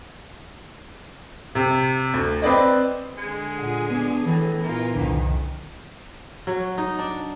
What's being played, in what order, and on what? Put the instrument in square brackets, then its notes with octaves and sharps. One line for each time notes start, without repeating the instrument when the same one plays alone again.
[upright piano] C3
D2
C4 B4 D5 D#5
[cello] D3 G#4 [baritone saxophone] G#3
[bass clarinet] A#2 [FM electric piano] F#5
[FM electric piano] B3 [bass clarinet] D4
[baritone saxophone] A2 [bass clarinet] E3
[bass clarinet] A#2 [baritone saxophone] E3 [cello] F4 A#4
[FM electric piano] C2 D3 [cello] F2 D#3
[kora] F#3
D#4
D4